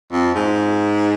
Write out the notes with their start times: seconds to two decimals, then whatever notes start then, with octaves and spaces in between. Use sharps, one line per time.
0.12 F2
0.35 G#2